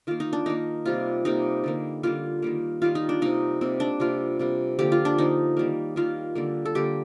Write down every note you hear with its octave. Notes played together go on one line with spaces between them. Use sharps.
D#3 A#3 F4
D#4
D4
D#3 A#3 D#4
C3 G3 A#3 F4
C3 G3 A#3 D#4
D3 G3 A#3
D3 G3 A#3 F4
D#3 G3 A#3
D#3 G3 A#3 F4
D#4
D4
C3 G3 A#3 D#4
C3 G3 A#3 C4
D4
C3 G3 A#3 F4
C3 G3 A#3
D3 F3 A#3 G4
F4
D4
D3 F3 A#3 D#4
D#3 G3 A#3
D#3 G3 A#3 F4
D3 G3 A#3
A4
D3 G3 A#3 G4